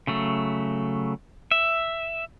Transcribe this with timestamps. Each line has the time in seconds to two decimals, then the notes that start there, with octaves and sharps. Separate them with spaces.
0.07 C#3 F#3 A3
1.51 E5